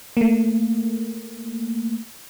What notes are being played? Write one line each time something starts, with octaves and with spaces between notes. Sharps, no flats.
A3 A#3